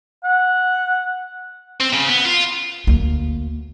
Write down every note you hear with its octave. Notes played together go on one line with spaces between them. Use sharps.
F#5
C4
C#3
B3
F4
D2 A#3